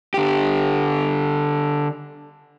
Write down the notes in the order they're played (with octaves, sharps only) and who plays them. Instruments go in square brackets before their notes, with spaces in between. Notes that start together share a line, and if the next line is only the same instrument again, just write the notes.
[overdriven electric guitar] D3 G4